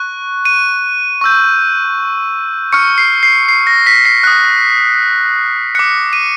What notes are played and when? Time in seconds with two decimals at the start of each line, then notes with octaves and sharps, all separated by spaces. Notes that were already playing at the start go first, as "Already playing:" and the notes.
Already playing: C#6 F#6
0.45 D#7
1.21 C#6 E6 G6
2.73 C#6 F6 C#7
2.98 C7
3.23 C7
3.49 C7
3.67 A#6
3.86 B6
4.05 C7
4.24 D#6 F#6
5.75 D6 F#6 C#7
6.13 D#7